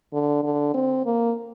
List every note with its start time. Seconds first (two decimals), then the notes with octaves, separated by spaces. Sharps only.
0.13 D3
0.43 D3
0.74 C4
1.05 A#3